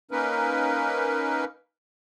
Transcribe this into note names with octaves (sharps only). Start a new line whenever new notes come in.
A#3 C#4 D#4 A#4 B4